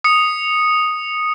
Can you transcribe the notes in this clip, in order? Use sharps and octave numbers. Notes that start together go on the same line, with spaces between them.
D#6 C#7